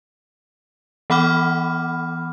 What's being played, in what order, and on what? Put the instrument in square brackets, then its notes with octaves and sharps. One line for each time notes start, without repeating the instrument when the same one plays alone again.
[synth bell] E3 B3 F#5 B5 D6 F6